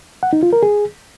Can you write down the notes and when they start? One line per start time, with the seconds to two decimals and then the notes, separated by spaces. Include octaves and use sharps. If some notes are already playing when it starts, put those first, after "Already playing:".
0.23 F#5
0.33 D#4
0.43 F4
0.53 A#4
0.63 G#4